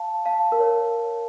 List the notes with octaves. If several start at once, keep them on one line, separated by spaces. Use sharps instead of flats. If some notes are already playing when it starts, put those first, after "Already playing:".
Already playing: F5 A5
F5 A5
A#4
C#5